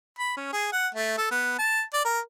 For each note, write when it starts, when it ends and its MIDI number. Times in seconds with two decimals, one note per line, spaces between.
0.19 0.36 83
0.37 0.49 61
0.52 0.69 68
0.72 0.88 78
0.95 1.16 57
1.18 1.28 69
1.31 1.54 59
1.59 1.82 81
1.94 2.01 74
2.05 2.19 70